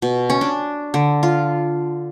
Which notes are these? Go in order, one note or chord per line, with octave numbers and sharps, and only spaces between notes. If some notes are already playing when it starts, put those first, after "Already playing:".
B2
C#4
D4
D3
F4